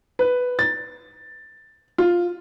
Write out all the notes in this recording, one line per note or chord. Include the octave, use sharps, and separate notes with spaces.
B4
A6
F4